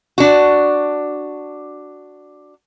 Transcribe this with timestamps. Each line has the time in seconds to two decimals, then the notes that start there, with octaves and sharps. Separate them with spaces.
0.18 D4 F#4